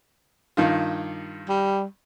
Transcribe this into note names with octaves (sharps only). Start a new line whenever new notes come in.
G2 D#3 F4
G3